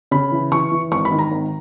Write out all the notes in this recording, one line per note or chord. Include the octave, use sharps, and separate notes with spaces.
C#3 B5
E3
E3 C#6
E3
G#1 C#6
B5
D#3
A#5
G#1